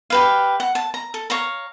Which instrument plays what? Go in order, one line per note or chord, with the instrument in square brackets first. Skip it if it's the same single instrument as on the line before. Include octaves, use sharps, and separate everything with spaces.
[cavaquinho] G4 B4 F5
F#5
A5
A#5
A4
C#5 F5 A#5